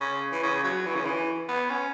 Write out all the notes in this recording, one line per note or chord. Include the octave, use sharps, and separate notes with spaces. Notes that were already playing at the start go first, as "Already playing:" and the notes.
C#3
E3
C#3
F#3
E3
C#3
E3
B3
C#4